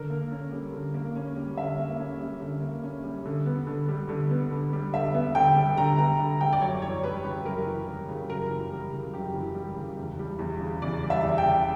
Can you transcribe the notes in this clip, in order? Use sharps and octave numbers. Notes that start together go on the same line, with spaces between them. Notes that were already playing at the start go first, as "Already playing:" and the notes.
Already playing: D3 A#4
A#3
C#4
G3
D3
A#3
C#4
G3
D3 E5
A#3
C#4
G3
D3
A#3
C#4
G3
D3
B3
D3
G3
D3
B3
D3
G3
D3 E5
B3
D3 G5
G3
D3 A#5
B3 A#5
D3
G3 G5
D5
F#2 C#5
E3 C#5
G3 B4
C#3 G4
F#2 A#4
E3
G3
C#3
F#2 A#4
E3
G3
C#3
F#2 G4
E3
G3
C#3
E2
G3
E2
C#3
E2 D5
G3
E5
E2
G5
C#3